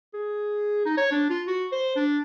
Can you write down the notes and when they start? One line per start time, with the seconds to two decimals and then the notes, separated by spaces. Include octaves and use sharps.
0.14 G#4
0.86 D#4
0.97 C#5
1.12 D4
1.30 F4
1.47 F#4
1.72 C5
1.96 D4